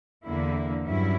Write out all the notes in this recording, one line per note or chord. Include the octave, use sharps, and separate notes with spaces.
E2 D3 A#3 E4
G2 F#3 C#4 E4